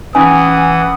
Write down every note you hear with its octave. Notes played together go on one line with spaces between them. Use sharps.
E3 C#4 F#5 G#5 D#6